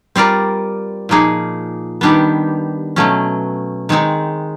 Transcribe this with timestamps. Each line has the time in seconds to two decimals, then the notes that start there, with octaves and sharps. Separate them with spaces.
0.16 G3 C4 F4 A#4 D5
1.09 A#2 F3 A#3 D#4 G#4
2.01 D#3 G3 B3 D4 G4
2.96 B2 F#3 A3 C#4
3.89 D#3 G#3 C4 D#4